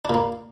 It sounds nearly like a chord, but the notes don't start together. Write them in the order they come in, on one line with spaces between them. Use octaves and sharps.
D4 A#2 A#3